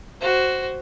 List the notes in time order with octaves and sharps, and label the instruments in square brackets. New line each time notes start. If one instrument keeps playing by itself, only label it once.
[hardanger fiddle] F#4 C5